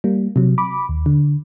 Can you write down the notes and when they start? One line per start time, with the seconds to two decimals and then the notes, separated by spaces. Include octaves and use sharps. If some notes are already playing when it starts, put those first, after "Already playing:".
0.04 G3 A#3
0.36 C3 F#3
0.58 B5 D6
0.89 D#2
1.06 D3